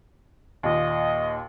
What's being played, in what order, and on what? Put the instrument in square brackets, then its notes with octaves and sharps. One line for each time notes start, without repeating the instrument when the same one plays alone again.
[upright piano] D#2 A#2 [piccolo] D#5